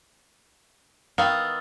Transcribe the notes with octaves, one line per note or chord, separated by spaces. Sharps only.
D#3 B3 F5 D#6 E6 A6